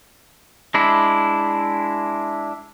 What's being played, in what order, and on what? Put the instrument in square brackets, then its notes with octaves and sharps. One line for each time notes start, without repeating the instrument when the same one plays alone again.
[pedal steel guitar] G#3 D4 E4